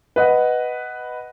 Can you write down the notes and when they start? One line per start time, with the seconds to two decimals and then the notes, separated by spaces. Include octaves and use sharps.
0.16 B4 D#5 F#5